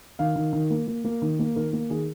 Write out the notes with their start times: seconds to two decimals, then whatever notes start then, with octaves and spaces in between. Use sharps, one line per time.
0.19 D#3 F5
0.36 D#3
0.53 D#3
0.70 A#3
0.87 A#3
1.04 A#3
1.22 D#3
1.39 A#3
1.56 D#3 A#4
1.73 A#3
1.90 D#3 G#4